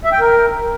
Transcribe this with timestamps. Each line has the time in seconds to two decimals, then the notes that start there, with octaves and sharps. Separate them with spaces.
0.04 E5
0.12 G5
0.20 A#4